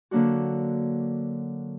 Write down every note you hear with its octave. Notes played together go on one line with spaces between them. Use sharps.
D3 F#3 A#3 D4 F#4